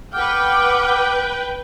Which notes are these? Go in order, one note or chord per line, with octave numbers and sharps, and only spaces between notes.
B4 F#5 G5 D6 F6